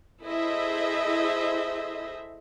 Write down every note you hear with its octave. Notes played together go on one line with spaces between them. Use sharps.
E4 G#4 A4 C5 D#5 E5